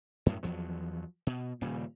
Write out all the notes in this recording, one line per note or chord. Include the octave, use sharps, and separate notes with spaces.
F#2 A2 F#3
E2 F3 F#3
B2
D#1 A#2 C#3 G3